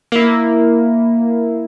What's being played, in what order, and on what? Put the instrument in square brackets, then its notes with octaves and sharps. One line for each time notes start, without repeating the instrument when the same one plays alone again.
[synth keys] A#3 E4